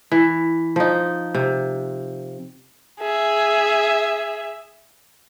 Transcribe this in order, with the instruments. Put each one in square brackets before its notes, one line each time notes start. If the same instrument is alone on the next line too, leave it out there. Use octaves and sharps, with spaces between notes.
[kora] E3
F3 D#4
C3
[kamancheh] G#4 E5